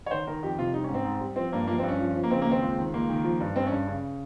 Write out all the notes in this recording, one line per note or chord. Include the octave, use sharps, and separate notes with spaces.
C#5
D#3 C5
D#3 A#4
F2 G4
C3 F4
G3 D#4
C#4
G#2
C4
G#2
G3
F3 C4
G2 A#3
F3 A#3
C4
G2
C#4
F3
F3
A#3
C#3 C4
A#3
D#2
C4
C#2
D#3
C#2 A#3
D#3
F3
G2
G2 C4
C#4
G2
C#3